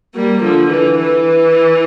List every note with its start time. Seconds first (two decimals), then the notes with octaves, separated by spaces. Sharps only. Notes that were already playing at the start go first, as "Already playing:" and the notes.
0.15 G3 A#3
0.43 D3 F3
0.70 E3
0.99 E3